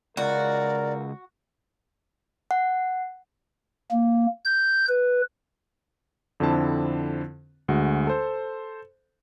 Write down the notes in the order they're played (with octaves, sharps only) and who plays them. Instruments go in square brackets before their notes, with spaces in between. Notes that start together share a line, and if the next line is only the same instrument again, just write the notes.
[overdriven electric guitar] C#2 [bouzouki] F#4 [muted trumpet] A#4 [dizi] D5
[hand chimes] F#5
[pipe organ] A#3
G6
B4
[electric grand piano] F2 D3 C4 E4 A5
D2 G#3 F#4
A4 C5